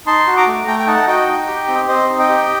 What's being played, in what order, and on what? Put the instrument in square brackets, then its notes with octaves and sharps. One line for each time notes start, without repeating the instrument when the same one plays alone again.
[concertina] D#4 A5 C6
F#4
A#5 D6
A3
A3 G5 A#5
G5
D#4 F#5 A5
F#4 D#5 G5
D#4
G4
C4
C4 C5 D#5
D#4
D#5 G5
G4